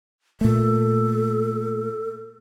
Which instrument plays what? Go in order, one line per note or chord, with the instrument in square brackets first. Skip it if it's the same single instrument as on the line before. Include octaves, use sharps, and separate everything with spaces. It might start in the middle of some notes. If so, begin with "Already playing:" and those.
[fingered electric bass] A#2 A3 [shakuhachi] A4